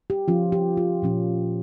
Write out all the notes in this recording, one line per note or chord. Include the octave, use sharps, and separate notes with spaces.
G4
F3 C#4 F4
G4
F4
A#2 F3 C#4